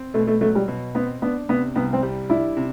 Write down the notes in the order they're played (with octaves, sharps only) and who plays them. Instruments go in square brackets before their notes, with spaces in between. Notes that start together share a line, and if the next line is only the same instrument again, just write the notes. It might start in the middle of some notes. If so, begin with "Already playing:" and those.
Already playing: [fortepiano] C4
[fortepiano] B2 [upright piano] A3
[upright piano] A3
[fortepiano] F#3 [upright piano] A3
[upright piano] G3
[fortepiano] B2
[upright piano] B3 [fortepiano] C4
[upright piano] B3 [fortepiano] D4
[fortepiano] C3 [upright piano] B3
[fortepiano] C2 [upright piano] B3
[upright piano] C4
[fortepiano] G3
[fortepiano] D4 [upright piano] E4
[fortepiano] C3